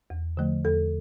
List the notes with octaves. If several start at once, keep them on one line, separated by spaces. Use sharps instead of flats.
E2
D3 F3 A3
E2 A4